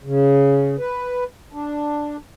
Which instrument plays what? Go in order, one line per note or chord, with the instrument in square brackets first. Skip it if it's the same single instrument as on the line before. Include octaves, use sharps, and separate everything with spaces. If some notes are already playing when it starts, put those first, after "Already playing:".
[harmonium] C#3
B4
D4